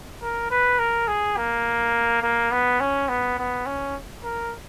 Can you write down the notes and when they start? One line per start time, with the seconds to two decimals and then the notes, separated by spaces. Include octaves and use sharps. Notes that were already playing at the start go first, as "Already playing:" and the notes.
0.22 A#4
0.51 B4
0.79 A#4
1.08 G#4
1.37 A#3
2.23 A#3
2.52 B3
2.81 C#4
3.09 B3
3.39 B3
3.66 C#4
4.24 A#4